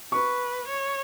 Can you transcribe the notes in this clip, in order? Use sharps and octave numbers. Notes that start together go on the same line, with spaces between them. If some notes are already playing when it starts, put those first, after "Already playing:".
B4 C#6
C#5